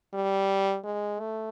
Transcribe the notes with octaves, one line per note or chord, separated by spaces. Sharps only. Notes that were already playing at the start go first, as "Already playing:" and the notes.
G3
G#3
A3